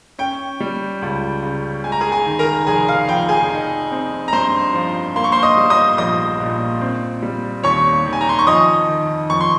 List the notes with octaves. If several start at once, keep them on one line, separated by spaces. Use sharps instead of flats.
C#4 G5
G3
C#2
C#3
G#3 G#5
A#5
G#4 G#5
G#4 G#5
D#3
A#4 A#5
F1 G#4 G#5
F5
F2 G5
G#4 G#5
D#4
C4
A#5
G2 C5 C6
F3
A#3 C6
C#6
C5 C6
D#5 D#6
G3
D#5 D#6
A#1 D#5 D#6
A#2
C4
G3
D#2 C#5 C#6
D#3
G#5
A#5
C6
C#6
F2 D#5 D#6
D#3
F2 C#6
C6